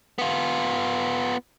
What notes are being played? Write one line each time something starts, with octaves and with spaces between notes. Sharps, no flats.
B3 F4